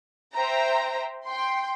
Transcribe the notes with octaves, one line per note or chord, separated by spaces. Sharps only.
C5 E5 G5 A#5
G5 C6